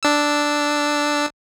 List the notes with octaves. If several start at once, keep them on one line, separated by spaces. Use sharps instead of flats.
D4 E6